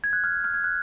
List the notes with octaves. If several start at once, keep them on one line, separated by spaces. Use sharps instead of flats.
G#6
F#6
F6
F6
G#6
F#6